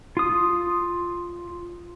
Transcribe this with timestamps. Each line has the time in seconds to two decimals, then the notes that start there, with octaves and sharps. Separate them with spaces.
0.17 F4 D#6